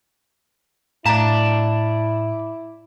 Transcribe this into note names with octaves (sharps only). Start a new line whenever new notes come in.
A2 E4 D5 F5 A5 A#5